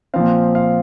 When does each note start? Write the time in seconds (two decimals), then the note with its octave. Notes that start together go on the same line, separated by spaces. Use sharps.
0.14 A#2 F3 C4 F5
0.55 F5